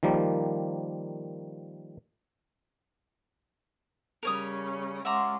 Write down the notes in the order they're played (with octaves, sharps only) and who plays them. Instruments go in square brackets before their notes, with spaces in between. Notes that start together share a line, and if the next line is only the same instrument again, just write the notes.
[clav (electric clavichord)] D#3 F3 G3 A#3
[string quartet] C#3 G3 C#4 [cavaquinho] A#4 C#5 D#6
[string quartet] G#3 C#4 F4 [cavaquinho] E5 A#5 [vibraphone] F#5 C6 D6